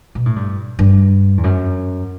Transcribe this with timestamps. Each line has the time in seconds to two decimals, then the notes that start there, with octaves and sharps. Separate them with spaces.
0.15 B2
0.26 A2
0.36 G2
0.79 G2
1.37 E2
1.44 F#2